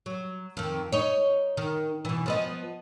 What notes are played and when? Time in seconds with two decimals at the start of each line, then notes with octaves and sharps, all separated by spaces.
0.06 F#3
0.57 F2 D#3
0.92 D#4 C#5
1.57 D#3
2.05 B2 E3
2.26 F3 B3 D#5